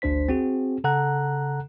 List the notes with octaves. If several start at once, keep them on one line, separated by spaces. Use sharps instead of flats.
G#1 D2 D4 C5 B6
C4 F#4 G#4
C#3 A4 F#5 A#5 F#6